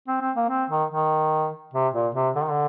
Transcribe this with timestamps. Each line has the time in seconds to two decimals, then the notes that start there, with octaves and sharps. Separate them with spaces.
0.08 C4
0.22 C4
0.36 A#3
0.50 C4
0.70 D#3
0.91 D#3
1.74 C3
1.94 A#2
2.15 C3
2.36 D3
2.43 D#3
2.50 D3